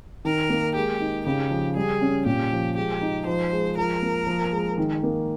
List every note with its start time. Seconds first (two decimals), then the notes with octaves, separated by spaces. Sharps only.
0.25 D#3 A#4
0.50 A#3
0.76 G#3 G4
1.00 D#4
1.26 C#3 G4
1.50 F3
1.76 G3 G#4
2.01 C#4
2.26 A#2 G4
2.52 F3
2.76 G#3 G4
3.01 D#4
3.26 F3 C5
3.52 G#3
3.77 F3 A#4
4.02 A#3
4.27 F3
4.52 G#3
4.78 D#3
5.03 A#3